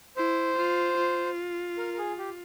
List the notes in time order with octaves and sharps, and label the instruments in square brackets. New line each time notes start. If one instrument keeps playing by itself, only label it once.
[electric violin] E4 [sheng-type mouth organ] C5
[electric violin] F4
F4
[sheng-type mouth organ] A#4
A#4
G#4
G4